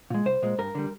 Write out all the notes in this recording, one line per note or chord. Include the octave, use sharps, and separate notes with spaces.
A#2 G#3
C2 C5
A#2 G#3
G2 A#4
D3 G3